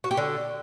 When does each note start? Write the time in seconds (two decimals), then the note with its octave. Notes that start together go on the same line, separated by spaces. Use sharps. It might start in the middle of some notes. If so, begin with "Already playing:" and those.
0.04 F#4
0.11 G4
0.17 D3